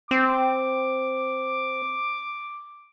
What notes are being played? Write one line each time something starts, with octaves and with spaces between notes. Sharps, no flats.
C4 D6